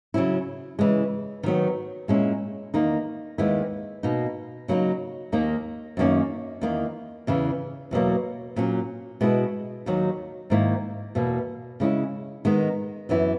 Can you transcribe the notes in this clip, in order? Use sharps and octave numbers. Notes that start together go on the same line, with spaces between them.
C#3 F#3 C#4 E4
C#3 E3 G#3
D#3 F#3 B3
A#2 G#3 C#4 E4
E2 D#3 A#3 D#4
D#2 D#3 G#3 B3 E4
B2 A#3 D#4
C#3 F#3 A#3 D#4
D#2 D#3 A#3 D#4
F#2 D#3 A#3 C#4
E2 D#3 A#3
E2 C#3 E3
E2 B2 F#3 A#3
A#2 F#3 C#4
B2 G#3 B3 E4
D#2 D#3 F#3
G#2 D#3 A#3 E4
E2 B2 A#3
C#3 G#3 C#4 E4
D#3 G#3 B3
F#2 E3 B3 E4